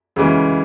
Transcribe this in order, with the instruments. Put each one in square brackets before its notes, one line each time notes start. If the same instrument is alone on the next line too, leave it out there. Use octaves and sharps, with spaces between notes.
[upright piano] D2 C#3 E3 G#3 C#4